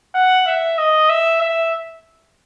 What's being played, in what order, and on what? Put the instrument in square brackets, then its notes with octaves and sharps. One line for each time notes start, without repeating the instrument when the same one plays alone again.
[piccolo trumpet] F#5
E5
D#5
E5
E5